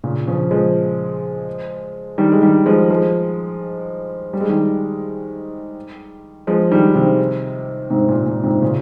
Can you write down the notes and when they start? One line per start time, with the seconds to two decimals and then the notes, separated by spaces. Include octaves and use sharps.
0.04 A#2 C#3
0.27 C#3 F3
0.51 F3 G#3
2.18 D#3 G3
2.32 G#3
2.42 D#3 G3
2.66 F3 G#3
2.90 F3 G#3
4.33 G3
4.41 G#3
4.49 D#3 G3
6.47 F3 G#3
6.71 D#3 G3
6.95 C3 D#3
7.90 G#2 C3
8.08 A#2
8.26 A#2
8.44 G#2 C3
8.62 A#2 C#3